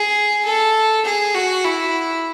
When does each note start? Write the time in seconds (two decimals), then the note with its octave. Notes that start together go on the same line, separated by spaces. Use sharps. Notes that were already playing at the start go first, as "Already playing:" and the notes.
Already playing: G#4
0.45 A4
1.05 G#4
1.35 F#4
1.64 E4